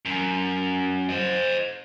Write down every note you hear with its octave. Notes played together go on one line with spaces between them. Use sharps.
F#2
C5 D#5